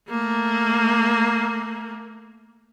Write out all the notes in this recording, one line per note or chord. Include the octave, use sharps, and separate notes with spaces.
A3 A#3